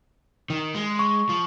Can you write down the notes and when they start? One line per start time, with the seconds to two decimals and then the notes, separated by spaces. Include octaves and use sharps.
0.50 D#3
0.75 G#3
0.99 C#6
1.29 F3